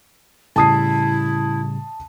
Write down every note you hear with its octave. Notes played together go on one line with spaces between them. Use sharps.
A2 C#3 G3 E4 A5 D#6 C7